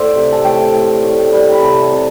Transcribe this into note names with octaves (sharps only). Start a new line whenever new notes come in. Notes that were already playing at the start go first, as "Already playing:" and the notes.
Already playing: A2 C5 D5 E5
C3
A5
A2 G5
A2
A2
G3
B5
C3 A5
C3